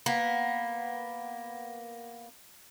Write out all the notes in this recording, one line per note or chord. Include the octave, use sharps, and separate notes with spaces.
A#3 B3